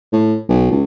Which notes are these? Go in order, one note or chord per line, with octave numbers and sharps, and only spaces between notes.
A2
B1
C#2